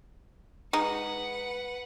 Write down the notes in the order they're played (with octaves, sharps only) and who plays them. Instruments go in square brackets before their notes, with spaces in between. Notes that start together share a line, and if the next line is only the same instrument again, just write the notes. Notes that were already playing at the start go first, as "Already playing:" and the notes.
[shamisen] G#3 D#4 [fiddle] B4 F#5